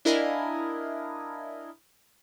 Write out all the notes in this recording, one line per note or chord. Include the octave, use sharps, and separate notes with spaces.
D4 E4 A#4 D#5 F5 G#5